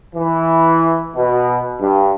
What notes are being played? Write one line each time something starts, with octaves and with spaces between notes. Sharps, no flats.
E3
B2
G2